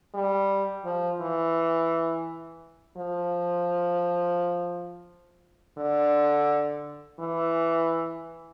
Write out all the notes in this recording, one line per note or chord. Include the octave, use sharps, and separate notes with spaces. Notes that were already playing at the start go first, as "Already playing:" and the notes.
G3
F3
E3
F3
D3
E3